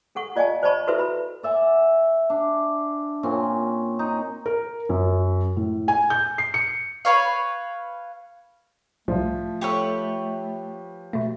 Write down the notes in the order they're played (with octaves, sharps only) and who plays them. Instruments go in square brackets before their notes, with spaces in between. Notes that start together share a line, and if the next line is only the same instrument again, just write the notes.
[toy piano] D4 A4 F#5 C#6
F4 D5 D#5 F5 G#5 A5
C5 D5 D#5 A5 B5 C#6
E4 F#4 A4 B4 C5 E5
B5
[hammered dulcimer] D5 E5 F#5 G#5
D4
A#2 C4 C#4
D#4
[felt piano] A#4
F#2
A2
G#5
G6
C7
C#7
[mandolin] B4 C#5 F5
[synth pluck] C2 A2 [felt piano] F3 [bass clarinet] A3
[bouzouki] G4 B4 C#5 [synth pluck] A4 C#6
[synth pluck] B2 A3